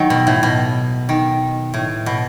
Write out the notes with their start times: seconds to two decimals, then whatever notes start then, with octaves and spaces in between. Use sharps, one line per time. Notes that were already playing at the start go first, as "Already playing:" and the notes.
Already playing: D#3 F#3
0.10 B2
0.27 A2
0.43 B2
1.09 D#3
1.74 A2
2.06 B2